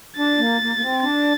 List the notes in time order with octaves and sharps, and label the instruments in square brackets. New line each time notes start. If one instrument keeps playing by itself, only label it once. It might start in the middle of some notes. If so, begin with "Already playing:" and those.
[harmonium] D4 [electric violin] A6
[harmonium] A#3
A#3
A#3
C4
[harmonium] D4 [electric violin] A6